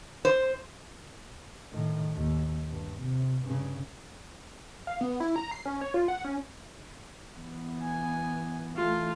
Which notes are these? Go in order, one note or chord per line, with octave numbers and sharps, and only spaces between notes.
C5
A2 D#3
D#2
G2
C3
G2 C#3
F5
B3
E4
A#5
C7
C#4
C#5
F4
F#5
C#4
E3 B3
G#5
E3 A3 F4